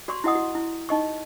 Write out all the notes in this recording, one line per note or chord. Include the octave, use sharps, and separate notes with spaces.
F#4 D5 C6 C#6
E4 F#4 D#5 F#5 D#6
F#4
E4
D#4 D#5 C#6